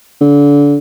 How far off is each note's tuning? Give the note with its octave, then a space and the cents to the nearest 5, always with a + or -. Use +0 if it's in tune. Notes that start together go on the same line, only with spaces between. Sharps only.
D3 -30